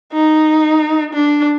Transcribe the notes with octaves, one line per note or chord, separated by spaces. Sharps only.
D#4
D4